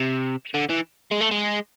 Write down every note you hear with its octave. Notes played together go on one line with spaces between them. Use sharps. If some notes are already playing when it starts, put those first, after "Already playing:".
Already playing: C3
D3
E3
G#3
A3
G#3